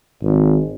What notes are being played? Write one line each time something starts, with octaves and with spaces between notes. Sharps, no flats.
G#1